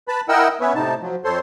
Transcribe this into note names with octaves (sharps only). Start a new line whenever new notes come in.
B4 A5 B5
E4 A#4 D#5 F#5 G5 E6
B3 C#4 B4 C#5 E5
A2 C3 D#4 A5
F3 F#3
F2 A4 C5 C#5 C6